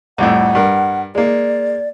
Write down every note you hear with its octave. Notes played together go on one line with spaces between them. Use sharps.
C2 F2 A2 F#5
G2 A#4
G#3 A#3 D5